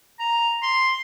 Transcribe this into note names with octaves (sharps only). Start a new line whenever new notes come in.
A#5
C6